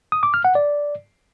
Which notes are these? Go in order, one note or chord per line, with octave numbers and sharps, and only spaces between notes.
D#6
D6
F6
F#5
D5